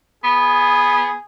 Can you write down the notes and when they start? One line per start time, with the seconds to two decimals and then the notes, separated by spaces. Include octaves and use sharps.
0.24 B3 G#4